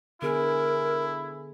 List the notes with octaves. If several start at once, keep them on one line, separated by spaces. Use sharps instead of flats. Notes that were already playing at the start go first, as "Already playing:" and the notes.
D3 B3 E4 G#4 A#4